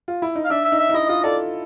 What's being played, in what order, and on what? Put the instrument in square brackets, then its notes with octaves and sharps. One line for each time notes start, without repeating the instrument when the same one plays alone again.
[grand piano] F4
E4
D#4
[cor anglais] F5
[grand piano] D4 [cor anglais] E5
[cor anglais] E5
[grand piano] D#4
[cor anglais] E5
[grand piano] D#4
[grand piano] E4 [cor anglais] D#5
[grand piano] F4 [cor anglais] D#5
[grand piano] A4 [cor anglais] D5